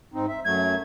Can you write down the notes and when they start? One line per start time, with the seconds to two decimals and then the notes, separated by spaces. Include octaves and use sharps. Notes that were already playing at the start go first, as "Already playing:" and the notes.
0.14 G#2 C4 D#4
0.28 E5
0.45 F#2 F#3 A3 G#6